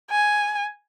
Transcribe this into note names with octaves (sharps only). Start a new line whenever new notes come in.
G#5